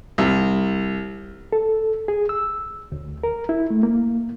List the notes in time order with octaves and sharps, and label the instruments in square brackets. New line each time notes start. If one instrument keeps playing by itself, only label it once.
[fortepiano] C2
[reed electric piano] A4
G#4
E6
D2
A#4
E4
A3
A#3